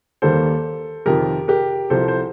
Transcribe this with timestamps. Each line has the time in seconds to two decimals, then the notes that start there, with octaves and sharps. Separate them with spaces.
0.22 D#2 D#3 G3 A#3 A4 C5
1.06 F2 C3 D#3 G4 A#4
1.48 G4 A#4
1.90 C2 C3 F3 A4 C5
2.08 C5